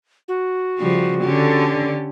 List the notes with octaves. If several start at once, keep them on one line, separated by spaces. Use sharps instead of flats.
F#4
C#3 F3 G3
D3 C#4 G4